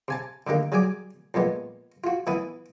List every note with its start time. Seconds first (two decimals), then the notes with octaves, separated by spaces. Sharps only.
0.08 C3 G#5 A5
0.47 D3 D#3 A#3 G4
0.72 F#3 G3 G#4 G#5 D6
1.34 F2 A#2 G#3 B3
2.04 F4 F#4
2.27 E3 B3 E4 B4 D#6